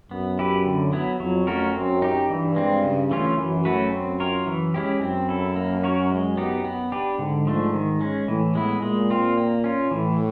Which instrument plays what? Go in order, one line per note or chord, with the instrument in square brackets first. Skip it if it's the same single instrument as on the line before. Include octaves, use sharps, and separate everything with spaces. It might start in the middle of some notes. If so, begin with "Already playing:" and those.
[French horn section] F#2 [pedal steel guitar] B3
[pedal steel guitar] E4 G4 B4
D3
F#3 B3 E4
[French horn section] F2 [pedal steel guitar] F#3
[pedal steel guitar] A3 C#4 F#4 A#4
[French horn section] F#2 [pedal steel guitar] C4
[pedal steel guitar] D#4 G4
[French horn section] G2 [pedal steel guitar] E3
[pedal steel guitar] G#3 C4
C#3
E3 A3 C#4 F4
[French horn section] F#2 [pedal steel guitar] E3
[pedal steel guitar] A3 C#4 F#4 B4
C4
F4 A#4 C#5
E3
G#3 C#4 E4 G4
[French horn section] F#2 [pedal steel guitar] C4
[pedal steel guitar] E4 A4
A#3
C#4 F#4 A#4 C#5
G#3
B3 D#4 G4
B3
D4 G4 B4
[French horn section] G#2 [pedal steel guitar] D3
[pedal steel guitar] F3 A3 D4
D#3
G#3 C#4
[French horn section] A2 [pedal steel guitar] E3
[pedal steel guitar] G#3 B3 E4
[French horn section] A#2 [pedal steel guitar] G#3
[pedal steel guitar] C4 F4
A#3
C#4 F4
[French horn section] A2 [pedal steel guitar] E3